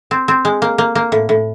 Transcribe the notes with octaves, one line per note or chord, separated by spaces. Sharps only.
C4
C4
G#3
A#3
A#3
A#3
A2
A2